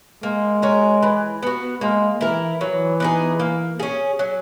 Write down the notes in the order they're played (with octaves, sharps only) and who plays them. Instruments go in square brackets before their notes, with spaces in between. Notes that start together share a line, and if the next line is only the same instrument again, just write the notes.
[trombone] G#3 [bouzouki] A#3
[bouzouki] C#4 F#4 A#4
E3
B3 F#4
[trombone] G#3 [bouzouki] A#3
[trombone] E3 [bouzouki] E4 A#4
[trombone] E3 [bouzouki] F#3
[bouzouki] B3 D#4 G#4
A#3
C#4 G#4
F#3